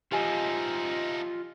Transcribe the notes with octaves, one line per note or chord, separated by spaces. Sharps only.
F3 D#4 F4 G4 D#5 G#5